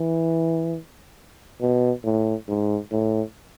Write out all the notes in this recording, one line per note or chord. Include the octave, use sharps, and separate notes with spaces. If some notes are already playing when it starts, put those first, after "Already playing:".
Already playing: E3
B2
A2
G#2
A2